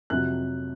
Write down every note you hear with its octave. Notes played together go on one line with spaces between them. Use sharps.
F2 C3 F#3 F#6